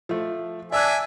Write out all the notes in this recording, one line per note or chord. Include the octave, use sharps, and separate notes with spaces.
F3 A3
D4 D5 E5 G#5 E6 F#6